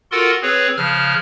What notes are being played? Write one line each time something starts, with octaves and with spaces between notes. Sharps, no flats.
F4 F#4 A4 A#4 F#5 C6
C4 G#4 B4 C#5
C#3 F3 F6 F#6